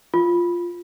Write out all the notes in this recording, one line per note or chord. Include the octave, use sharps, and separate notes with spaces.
F4